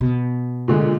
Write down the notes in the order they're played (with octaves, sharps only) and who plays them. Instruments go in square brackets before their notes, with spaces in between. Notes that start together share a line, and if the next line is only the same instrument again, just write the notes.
[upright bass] B2
[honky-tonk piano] A#2 D3 G#3